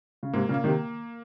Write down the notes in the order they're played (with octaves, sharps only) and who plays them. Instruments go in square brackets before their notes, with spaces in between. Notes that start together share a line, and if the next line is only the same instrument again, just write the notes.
[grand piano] C#3
[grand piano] G#2 C3 [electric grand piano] A#3
[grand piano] A#2 C#3
[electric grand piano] A#3
[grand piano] C3 D#3